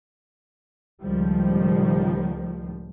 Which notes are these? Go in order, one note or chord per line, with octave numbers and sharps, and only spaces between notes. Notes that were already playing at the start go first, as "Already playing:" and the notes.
C#2 A2 D#3 F3 G3